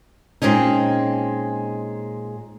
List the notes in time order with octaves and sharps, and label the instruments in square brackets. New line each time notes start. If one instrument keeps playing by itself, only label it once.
[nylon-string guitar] A#2 G#3 C4 C#4 D#4